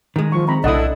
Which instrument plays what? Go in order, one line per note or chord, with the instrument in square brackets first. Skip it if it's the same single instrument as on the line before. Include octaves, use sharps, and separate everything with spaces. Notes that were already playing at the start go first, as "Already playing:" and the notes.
[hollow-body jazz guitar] D#3 G#3
[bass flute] F3 [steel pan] C#6
[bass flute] C4 [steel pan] A#5 B5
[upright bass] B1 [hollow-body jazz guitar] D4 E4 [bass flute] A4 [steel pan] D#5 F#5 D#6